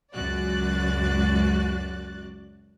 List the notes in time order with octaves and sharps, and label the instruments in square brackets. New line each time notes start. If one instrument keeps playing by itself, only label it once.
[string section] C#2 F#2 F#4 D5 F#6 A6